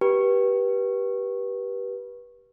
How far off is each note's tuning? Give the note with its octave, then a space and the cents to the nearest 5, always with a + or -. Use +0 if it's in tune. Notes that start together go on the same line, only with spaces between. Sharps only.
G4 -10 B4 -25